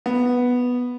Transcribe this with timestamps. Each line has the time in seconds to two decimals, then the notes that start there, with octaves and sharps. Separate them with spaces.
0.06 B3